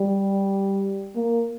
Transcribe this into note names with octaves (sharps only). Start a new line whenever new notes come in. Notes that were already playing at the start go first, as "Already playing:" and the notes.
Already playing: G3
A#3